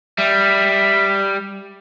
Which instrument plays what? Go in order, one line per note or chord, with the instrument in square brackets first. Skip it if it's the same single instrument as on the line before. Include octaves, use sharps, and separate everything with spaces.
[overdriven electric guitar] G3 [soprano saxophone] E5